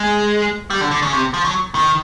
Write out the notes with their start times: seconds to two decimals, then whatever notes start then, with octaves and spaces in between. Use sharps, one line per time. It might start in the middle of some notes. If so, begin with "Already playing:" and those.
Already playing: G#3
0.70 G3
0.81 D3
0.91 D3
1.02 C#3
1.13 C3
1.34 F3
1.45 F#3
1.75 D#3